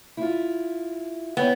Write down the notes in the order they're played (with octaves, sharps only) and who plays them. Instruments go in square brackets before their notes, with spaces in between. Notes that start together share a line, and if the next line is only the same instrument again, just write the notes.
[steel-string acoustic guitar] E4 F4
[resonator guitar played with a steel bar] B3 [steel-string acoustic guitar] E4 C#5 G5